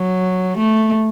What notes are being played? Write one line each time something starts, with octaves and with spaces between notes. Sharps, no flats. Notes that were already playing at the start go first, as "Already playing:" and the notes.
Already playing: F#3
A3